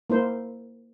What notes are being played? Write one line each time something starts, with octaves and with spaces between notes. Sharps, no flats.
A#3 E4 C5